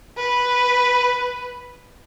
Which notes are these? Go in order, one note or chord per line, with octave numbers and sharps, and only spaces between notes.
B4